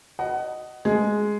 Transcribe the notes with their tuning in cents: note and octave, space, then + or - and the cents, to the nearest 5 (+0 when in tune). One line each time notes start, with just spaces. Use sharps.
D#5 +0 F#5 +20
G#3 +0 G#4 +10